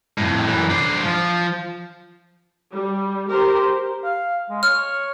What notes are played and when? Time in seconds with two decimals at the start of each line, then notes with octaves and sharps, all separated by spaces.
0.18 F2 A2
0.47 F#2 E3
0.70 D4 C5
1.03 F3
2.71 G3
3.29 G4 A#4 C5
4.04 F5
4.50 G#3
4.63 C#5 F6